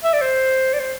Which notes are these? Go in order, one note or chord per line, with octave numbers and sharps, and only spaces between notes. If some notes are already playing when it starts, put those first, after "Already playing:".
E5
D5
C5
D5
C5